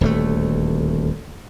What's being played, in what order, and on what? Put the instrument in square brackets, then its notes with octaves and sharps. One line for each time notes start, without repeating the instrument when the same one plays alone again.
[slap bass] D#1 D2 G3 A3